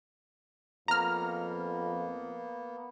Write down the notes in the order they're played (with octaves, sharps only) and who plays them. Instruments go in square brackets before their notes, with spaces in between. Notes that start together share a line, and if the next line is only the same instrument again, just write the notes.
[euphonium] F2 [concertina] A#3 B3 [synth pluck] A#5 F6